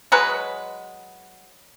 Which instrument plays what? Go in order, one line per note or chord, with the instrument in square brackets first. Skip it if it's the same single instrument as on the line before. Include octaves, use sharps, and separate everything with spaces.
[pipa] F#3 G#3 B4